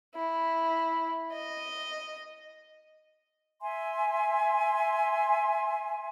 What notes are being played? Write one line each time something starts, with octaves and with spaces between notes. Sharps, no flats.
E4
D#5
E5 G#5 C6